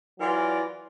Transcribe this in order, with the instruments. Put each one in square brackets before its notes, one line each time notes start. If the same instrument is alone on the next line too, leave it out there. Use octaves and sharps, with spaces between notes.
[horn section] E3 F#3 F4 A#4 D5